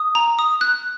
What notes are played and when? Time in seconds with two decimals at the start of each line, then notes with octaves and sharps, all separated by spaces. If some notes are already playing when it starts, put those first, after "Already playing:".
Already playing: D#6
0.15 A#5
0.39 D#6
0.61 F#6